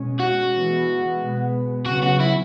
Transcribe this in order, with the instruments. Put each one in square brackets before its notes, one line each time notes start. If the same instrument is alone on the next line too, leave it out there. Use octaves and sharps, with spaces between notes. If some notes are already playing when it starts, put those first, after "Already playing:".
Already playing: [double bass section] B2 G#3 C#4
[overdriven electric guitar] F#4
[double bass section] E3 G#3 B3
B2 G#3 B3
[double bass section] C#3 F#3 B3 [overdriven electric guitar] F#4
[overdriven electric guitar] F#4
E4